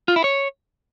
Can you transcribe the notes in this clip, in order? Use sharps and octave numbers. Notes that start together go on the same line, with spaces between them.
F4
E4
C#5